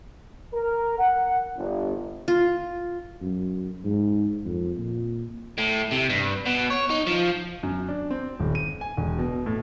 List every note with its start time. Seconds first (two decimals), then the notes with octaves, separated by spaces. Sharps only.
0.54 A#4
0.99 F#5
1.57 G1
2.28 F4
3.21 F#2
3.85 G#2
4.45 F2
4.77 A#2
5.58 A2
5.91 C3
6.09 G2
6.46 B2
6.70 C#5
6.90 D#4
7.07 F3
7.63 F#2
7.89 D4
8.11 C4
8.39 D#1
8.55 D#7
8.81 G#5
8.97 E1
9.18 B2
9.46 A2